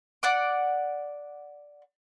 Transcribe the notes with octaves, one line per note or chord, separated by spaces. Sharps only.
D5 F#5 D6